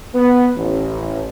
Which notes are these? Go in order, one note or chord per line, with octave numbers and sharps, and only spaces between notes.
B3
A1